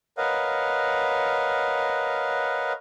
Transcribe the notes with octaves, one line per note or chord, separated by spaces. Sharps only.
A#4 B4 C#5 D#5 F5 F#5